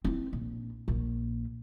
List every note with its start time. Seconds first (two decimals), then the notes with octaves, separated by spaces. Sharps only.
0.05 C4 E4
0.33 A#1
0.88 A#1 A#2